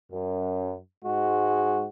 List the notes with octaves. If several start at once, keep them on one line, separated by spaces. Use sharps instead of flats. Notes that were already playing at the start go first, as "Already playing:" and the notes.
F#2
G#2 G#3 F#4